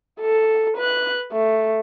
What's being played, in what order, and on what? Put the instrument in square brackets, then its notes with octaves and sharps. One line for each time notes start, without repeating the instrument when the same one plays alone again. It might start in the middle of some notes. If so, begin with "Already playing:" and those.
[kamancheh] A4
B4 F#6
A3